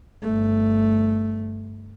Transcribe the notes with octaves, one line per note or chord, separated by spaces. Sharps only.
G1 A3